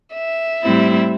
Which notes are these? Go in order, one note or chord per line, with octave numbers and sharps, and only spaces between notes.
E5
A2 G3 C4 E4